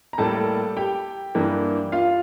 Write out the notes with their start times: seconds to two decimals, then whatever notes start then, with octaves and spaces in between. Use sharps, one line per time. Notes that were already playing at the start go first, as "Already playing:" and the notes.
0.13 A#5
0.18 A2 G3 A#3 A4 A5
0.77 G4 G5
1.35 G2 E3 A#3
1.92 F4 F5